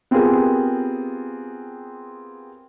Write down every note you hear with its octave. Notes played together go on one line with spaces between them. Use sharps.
B3 C4 F4 G4 G#4 A#4